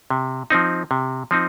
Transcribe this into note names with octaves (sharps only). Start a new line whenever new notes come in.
C3
F3 C4 D#4
C3
F3 C4 D#4